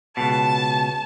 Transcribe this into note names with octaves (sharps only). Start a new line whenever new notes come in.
C#2 B2 A5